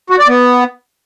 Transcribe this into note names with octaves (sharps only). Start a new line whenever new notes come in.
F#4
D5
B3